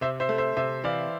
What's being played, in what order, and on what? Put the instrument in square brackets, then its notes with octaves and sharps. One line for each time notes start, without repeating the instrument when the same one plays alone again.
[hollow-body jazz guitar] C3 [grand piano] C5 E5
[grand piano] C5 E5
[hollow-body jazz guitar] A3
[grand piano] C5 E5
[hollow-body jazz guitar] C3 [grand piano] C5 E5
[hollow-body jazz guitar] E3 [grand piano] D5 F5